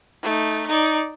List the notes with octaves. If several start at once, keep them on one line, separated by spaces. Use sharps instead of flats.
A3 D#4
D#4 D5